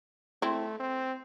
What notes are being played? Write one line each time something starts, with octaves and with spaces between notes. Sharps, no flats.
A3 C4 E4
C4